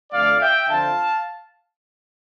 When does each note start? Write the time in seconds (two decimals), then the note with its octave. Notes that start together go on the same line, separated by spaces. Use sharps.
0.12 F2 D3 A3 D5 F5
0.41 E5 G5
0.70 D3 F3 C4 F5 A5